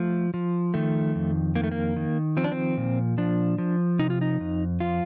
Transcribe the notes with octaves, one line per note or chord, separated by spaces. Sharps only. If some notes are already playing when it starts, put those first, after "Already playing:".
Already playing: F3 A3
F3
D#3 A3
F2
D#3 A#3
A3
A#3
D#3
F3 C4
D4
C4
A#2
F3 D4
F3
C3 D#4
F4
D#4
F2
F3 F4